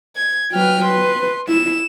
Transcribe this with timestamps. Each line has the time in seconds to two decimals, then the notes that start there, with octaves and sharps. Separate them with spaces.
0.16 G#6
0.52 F#3 B4 G5 F6
0.85 B4 C6
1.49 E4 E7